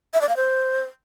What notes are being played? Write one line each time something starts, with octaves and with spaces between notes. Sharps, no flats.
E5
D5
F5
C5